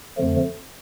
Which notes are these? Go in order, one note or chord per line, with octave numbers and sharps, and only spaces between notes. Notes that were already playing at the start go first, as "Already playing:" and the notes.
F2 D3 F3 A3